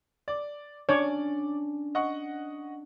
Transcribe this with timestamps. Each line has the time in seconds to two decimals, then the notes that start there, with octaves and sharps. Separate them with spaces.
0.28 D5
0.89 C#4 D4 C#5 D5
1.95 D#5 F#5 C#6